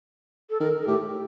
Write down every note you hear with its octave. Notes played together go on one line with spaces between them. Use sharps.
A4
D#3 A#4
A4
A2 G4